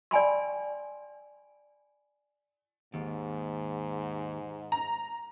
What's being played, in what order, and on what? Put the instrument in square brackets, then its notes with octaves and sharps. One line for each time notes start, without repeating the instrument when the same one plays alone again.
[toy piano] D5 G5 G#5 B5 C6
[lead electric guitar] D#2 [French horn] G#2
[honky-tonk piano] A#5